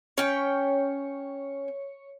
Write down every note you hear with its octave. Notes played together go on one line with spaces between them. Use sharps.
C#4 C#5 G5